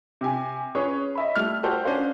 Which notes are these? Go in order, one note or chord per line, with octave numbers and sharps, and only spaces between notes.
C3 G4 G#5
C#4 G#4 B4 C#5
D#5 E5 B5
G3 A3 F6
F#4 G4 A4 C5 G5
C#4 D4 F#4 C5 F5